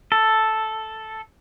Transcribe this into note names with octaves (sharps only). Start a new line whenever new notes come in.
A4